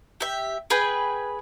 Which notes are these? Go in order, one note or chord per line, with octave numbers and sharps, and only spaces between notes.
G4 E5
G#4 B4 G5 G#5